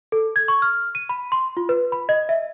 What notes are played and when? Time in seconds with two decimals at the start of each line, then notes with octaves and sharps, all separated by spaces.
0.12 A4
0.36 G#6
0.48 C#6
0.62 F6
0.95 D#7
1.09 B5
1.32 C6
1.57 F4
1.69 B4
1.92 B5
2.09 D#5
2.29 E5